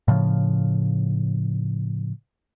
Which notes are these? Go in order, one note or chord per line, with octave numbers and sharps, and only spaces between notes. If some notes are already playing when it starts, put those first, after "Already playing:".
A2 C#3 F3